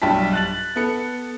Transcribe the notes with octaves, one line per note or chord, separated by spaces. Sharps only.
B1 G2 G5 A5 B6
F#6 A6 F#7
B3 A4 C#7